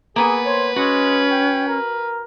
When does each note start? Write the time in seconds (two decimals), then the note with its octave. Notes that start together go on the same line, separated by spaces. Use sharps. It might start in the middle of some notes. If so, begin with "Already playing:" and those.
0.16 A#3 B3 G#4 B4 G#5
0.45 C5 C#5
0.76 G#3 C#4 F#4
1.31 G5
1.67 A#4